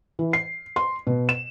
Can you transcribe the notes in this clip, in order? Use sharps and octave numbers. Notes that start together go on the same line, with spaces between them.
E3
C7
C6
B2
E7